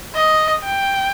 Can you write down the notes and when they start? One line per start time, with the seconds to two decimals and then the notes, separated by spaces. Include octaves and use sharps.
0.14 D#5
0.63 G5